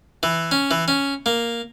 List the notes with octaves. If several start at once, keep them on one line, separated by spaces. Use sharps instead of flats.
E3
C#4
E3
C#4
A#3